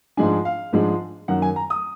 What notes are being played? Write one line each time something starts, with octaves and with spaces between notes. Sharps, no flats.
G#2 F3 G#3 D4 G#5
F5
G#2 F3 G#3 D4
F#2 D#3 A#3 F#5
G#5
A#5
D#6